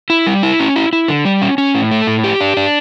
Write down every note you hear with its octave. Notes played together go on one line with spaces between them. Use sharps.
E4
G3
E4
C#4
E4
E4
D3
G3
C#4
C#4
A2
A3
A2
G4
D4
D4